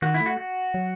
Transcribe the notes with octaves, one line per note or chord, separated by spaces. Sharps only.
D#3 F#4
E4
A3
F#4
F#4
F#3